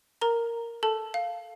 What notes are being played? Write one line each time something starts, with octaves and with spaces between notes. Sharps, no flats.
A#4 A#5
A4 A5
F5